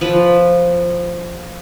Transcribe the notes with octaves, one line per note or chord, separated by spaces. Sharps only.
F3 B4